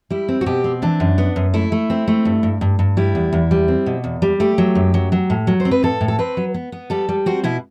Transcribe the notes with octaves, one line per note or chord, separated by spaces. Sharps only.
G3 E4
C4
F#4
B2 G4
C4
E3 D4
F#2
B3
F#2
A3 E4
A3
C4
A3
G2
G2
G2
G2
G3 E4
E2
E2
G3
C4
B2
E2
G3
A3 G4
F#3
F#2
F#3
F#3
A2
F#3
C5
C4
B4
A2 A4
A2
A4
C4 B4
F#3
B3
B3
G3 A4
G3
C4 F#4
B2 E4